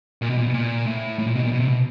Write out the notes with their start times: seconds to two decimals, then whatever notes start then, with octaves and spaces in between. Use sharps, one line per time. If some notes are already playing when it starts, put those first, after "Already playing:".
0.22 A#2
0.30 B2
0.38 A#2
0.46 B2
0.54 A#2
0.86 A2
1.19 A2
1.27 A#2
1.36 B2
1.43 A#2
1.52 B2
1.60 C3
1.68 B2